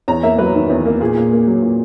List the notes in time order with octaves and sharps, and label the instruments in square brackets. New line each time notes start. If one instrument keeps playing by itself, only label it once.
[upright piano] E2 A#5
A#3 E5
F#3 B4
D#3
E2
A#3
A#2 G#4
A#2
A#3
F#3
A#2